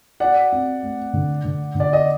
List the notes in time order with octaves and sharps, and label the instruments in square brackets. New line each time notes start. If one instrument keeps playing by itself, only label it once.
[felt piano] F#4 [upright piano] D5 F#5
[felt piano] C4
A3
D3
D3
D3
[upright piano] D5
D#5